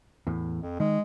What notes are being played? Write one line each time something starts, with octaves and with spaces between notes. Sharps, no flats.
E2 A2
F2
D#3 G#3